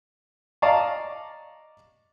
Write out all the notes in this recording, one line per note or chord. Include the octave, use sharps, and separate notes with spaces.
D5 D#5 F5 A5 A#5 C#6